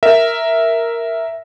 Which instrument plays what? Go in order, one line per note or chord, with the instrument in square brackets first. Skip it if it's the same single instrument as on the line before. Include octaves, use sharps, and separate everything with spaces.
[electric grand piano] A#4 E5